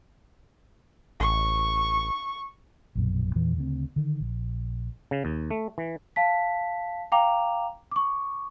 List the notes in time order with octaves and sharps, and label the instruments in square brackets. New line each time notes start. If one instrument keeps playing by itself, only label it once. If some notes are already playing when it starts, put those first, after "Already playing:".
[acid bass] A1 [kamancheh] C#6
[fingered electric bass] A#1 F#2 B2
E2 A#2 E3
D2 C#3 C4
D3 D#3
A#1
[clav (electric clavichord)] C#3
D#2
A3
E3
[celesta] F5 A5 B6
F5 G5 A#5 D6 F7
C#6 D6